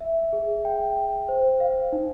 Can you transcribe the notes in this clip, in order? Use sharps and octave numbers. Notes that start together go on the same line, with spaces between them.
E5
G#4
G5
G5
C5
F5
D#4